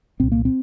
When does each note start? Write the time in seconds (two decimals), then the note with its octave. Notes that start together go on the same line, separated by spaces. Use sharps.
0.20 C2 A#2 C4
0.32 A#3
0.45 C4